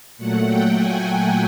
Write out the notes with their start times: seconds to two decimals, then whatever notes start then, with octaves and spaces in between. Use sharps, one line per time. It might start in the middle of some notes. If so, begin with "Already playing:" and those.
0.17 A#2 F#3 A3 F#5
0.46 G5
0.76 G#5
1.05 G5